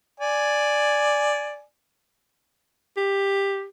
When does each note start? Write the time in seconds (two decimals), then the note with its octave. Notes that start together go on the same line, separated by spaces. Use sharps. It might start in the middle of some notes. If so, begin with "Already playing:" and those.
0.20 D5 G#5
2.97 G4